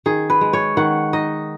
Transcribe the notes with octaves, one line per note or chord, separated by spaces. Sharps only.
D#3 G#4
B4
G#3
C#5
D#3 F#5
D#4 D#5